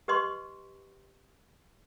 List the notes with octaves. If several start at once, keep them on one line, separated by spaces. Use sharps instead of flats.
G4 B4 D#5 C6 C#6